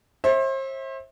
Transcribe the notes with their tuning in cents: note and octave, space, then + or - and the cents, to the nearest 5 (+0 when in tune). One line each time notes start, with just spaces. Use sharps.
C5 +40 E5 -20